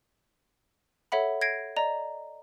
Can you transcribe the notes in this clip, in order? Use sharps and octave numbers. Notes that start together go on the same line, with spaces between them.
A4 C#5 E5 F#5 B5
G#6 A#6 C7 D7
D5 D#5 A#5